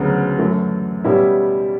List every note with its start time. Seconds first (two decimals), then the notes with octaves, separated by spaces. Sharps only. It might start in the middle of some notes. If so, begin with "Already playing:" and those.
Already playing: D2 C#3 F#3 B3
0.39 F#2 E3 A3
1.04 B2 G3 C#4 E4 G4